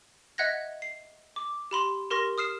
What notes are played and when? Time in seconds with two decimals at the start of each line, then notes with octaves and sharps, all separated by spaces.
0.38 D#5 E5 F#5 F#6 G#6 A#6
0.82 C7
1.36 D6
1.71 G4 B5 C6
2.11 G4 A#4 C6 C#6 A#6
2.38 D#6 F6 C7 E7